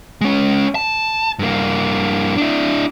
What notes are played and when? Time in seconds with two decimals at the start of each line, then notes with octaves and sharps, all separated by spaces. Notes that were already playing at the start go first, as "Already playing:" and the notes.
0.21 G#3 C#4
0.75 A5
1.39 G2 A#3
2.38 D4 E4